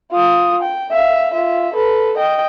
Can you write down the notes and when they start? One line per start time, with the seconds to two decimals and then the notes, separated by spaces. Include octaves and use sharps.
0.11 F4 D#6
0.62 G5
0.91 E5 F5
1.33 F4 E5
1.74 A4 B4
2.17 D#5 G5